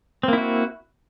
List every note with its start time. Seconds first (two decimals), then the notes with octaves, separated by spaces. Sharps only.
0.23 C4
0.28 A#3
0.33 E4
0.38 F#4